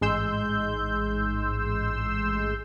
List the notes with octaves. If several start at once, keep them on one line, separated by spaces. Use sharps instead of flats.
A1 G#2 G#3 C6 E6 G6